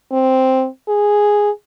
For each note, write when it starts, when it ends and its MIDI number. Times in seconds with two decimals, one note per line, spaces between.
0.12 0.67 60
0.88 1.50 68